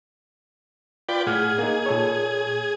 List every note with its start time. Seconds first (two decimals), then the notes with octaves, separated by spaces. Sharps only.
1.09 F4 B4 D5 G5
1.27 A2 G#4 F#5 F6
1.59 A#3 D#4
1.86 A#2 A4 C#5